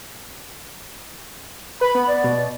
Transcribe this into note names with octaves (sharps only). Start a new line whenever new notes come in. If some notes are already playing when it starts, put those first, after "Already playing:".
B4 B5
B3
D5
B2